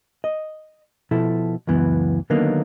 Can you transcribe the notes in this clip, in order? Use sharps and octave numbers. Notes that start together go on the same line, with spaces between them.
D#5
B2 F3 E4 A4
C#2 F#2 E3 B3
D3 D#3 F#3 A#3 B3 D#4